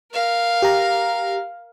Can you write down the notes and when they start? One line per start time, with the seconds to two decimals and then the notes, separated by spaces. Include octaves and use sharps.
0.13 A#4 F5
0.62 G4 A#5